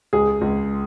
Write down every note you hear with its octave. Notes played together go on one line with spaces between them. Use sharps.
C#2 G#3 G#4
C#2